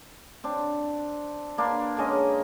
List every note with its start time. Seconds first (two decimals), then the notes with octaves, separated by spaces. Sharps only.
0.44 C4 D4
1.58 A#3 D4 B4 C6
1.97 D3 G#3 C#4 D#5